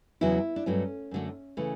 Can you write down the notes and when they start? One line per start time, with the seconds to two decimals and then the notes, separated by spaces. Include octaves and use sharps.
0.21 E2 C#3 F#3 E4
0.56 D4
0.66 G2 F#3 A3 C#4
1.11 F#2 D3 F#3 A3
1.57 C#3 E3 A3